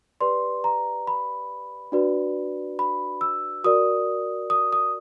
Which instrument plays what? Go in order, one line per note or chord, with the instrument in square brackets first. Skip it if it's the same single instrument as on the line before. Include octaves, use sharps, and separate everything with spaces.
[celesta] G4 B4 D5 C6
A#5
B5
D4 F#4 B4 D5
B5
E6
F#4 A#4 D5 D#6
D#6
D#6